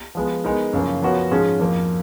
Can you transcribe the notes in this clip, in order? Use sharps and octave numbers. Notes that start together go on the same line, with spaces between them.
F3 G#3 B3
G#3 B3 D#4 A#4
F#2 C#3 F3 A#3
F3 B3 F#4 A#4 C#5
G#2 F3 G#3 C#4 G#4
F2 F3 A#3